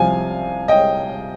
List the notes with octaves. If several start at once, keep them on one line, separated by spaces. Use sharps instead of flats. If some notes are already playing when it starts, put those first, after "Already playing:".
Already playing: C2 C3 F3 F5 G#5
D#5 G5